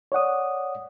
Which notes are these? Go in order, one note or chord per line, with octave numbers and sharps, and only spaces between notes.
C#5 D5 F#5 D#6